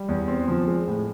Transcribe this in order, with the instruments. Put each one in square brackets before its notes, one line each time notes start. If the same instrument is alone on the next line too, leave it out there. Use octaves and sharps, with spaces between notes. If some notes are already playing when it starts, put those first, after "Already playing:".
Already playing: [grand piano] G3
E2
C4
F3
G#3
A2